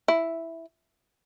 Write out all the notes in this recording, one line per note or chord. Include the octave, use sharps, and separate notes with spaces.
E4